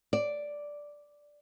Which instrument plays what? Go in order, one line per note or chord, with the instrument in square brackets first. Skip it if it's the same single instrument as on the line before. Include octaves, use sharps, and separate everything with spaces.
[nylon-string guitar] D5